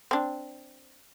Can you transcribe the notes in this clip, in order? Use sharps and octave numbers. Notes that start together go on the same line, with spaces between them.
C4 D4